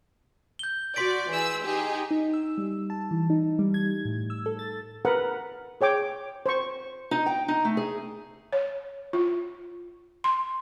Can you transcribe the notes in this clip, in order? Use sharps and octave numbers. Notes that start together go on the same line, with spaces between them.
G6 G7
F#4 D5 C6 B6 D7
E3 G#4 E6
D#4 G4 G#4
D#4
E6
G3
A5
E3
D#4
G3
G#6
A2
E6
A4
A6
A#4 B4 F#5
G#4 C#5 G5 D6
C5 C#6
D#4
G5
D#4
A3
G#4
C#5
F4
C6